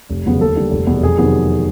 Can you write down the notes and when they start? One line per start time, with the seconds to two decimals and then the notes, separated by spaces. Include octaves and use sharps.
0.09 F1
0.25 E2 C#3 F#3 B3
0.41 D#2 A4
0.56 D3 G3
0.71 F1
0.87 E2 B2 G3 B3
1.03 F2 G#4
1.18 C3 D#3 F#3 B3 G#4